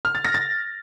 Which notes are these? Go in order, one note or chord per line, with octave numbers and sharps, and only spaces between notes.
F6
A6
A#6
A6